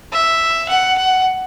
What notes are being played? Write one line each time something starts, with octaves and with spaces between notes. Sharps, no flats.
E5
F#5
F#5